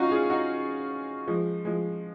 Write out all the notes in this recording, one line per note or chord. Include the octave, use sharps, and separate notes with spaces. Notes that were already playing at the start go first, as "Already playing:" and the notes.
Already playing: C#4 D#4 F4 F#4
F4 G#4
D#4 F#4
F3 G#3
F3 G#3